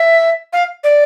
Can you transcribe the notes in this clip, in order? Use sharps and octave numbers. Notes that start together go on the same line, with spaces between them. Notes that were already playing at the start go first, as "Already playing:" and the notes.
Already playing: E5
F5
D5